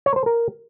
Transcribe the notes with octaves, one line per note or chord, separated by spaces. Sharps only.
C#5
C5
A#4